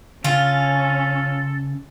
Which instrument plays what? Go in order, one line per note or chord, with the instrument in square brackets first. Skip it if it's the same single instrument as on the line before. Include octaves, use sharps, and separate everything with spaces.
[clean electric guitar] C#3 [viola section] C#4 [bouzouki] F4 [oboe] A4